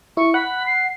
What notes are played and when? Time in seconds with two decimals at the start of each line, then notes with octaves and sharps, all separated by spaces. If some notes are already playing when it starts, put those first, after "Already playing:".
0.17 E4 C#6
0.34 F#5 B5
0.66 C7